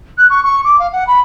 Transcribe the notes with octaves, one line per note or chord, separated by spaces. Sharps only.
F#6
C#6
C#6
D6
F5
F#5
B5